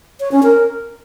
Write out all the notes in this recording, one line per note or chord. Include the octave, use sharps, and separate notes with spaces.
C#5
C#4
A#4